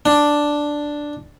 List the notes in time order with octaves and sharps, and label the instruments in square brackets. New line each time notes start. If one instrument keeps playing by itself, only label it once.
[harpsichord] D4